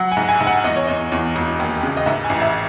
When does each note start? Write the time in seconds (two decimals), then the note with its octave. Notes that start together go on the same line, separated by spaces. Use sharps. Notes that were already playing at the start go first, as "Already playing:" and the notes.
Already playing: F#3 F#5
0.12 G#5
0.17 G#2
0.29 G#5
0.40 G#2
0.47 F#5
0.64 E2 D#5
0.76 C#5
0.87 E2 D#5
1.12 E2
1.36 E1
1.60 D#2
1.83 C#3
1.97 D#5
2.06 G#2 E5
2.24 G#5
2.30 A1
2.42 E5